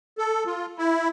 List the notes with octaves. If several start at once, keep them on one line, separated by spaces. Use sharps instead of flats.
A4
F4
E4